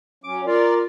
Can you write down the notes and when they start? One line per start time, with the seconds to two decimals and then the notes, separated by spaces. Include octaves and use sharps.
0.24 F#3 C#4 D6
0.46 F4 A#4 D5